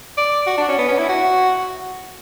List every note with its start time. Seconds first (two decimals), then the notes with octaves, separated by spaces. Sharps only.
0.17 D5
0.47 F#4
0.57 D4
0.68 C#4
0.78 B3
0.88 C#4
0.98 E4
1.09 F#4